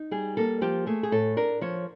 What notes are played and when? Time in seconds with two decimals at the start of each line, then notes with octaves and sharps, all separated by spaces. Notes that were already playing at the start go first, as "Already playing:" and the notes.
Already playing: D#4
0.11 G3 G#4
0.37 A#3 A4
0.61 F3 G4
0.86 A3 G#4
1.03 G#4
1.12 A2 A4
1.37 D4 A#4
1.61 F3 C#5